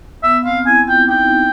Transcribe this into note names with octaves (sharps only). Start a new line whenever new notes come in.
B3 E5
C4 F5
E4 G#5
F4 G5
D#4 G5